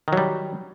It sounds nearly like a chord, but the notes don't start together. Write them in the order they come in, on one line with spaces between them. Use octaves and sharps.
D#3 F#3 G3